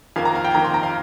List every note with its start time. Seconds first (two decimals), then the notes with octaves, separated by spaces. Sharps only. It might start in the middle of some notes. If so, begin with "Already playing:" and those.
0.16 F2 D#3 A#3 F5
0.25 A#5
0.35 F5
0.44 G5
0.55 F2 D#3 A#3 A#5
0.64 C6
0.74 A#5
0.83 F5